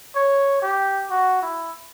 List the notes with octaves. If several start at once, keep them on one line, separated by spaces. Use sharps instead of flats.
C#5
G4
F#4
E4